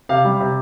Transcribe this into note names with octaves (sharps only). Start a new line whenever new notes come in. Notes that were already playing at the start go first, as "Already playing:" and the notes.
C3 F5
G3
C3